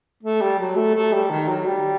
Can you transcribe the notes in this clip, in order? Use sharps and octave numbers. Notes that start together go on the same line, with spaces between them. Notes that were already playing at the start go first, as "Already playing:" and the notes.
A3
G3
F#3
A3
A3
G3
D#3
F#3
G3